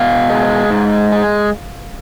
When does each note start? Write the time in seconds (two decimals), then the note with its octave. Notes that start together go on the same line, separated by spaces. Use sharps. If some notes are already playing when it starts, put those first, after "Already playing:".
Already playing: B2 F5
0.30 G#3
0.71 G#2
1.12 G#3